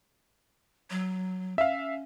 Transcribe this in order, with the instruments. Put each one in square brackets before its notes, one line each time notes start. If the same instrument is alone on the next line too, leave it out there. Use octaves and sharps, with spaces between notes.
[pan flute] F#3
[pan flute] C#4 [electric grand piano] E5 F5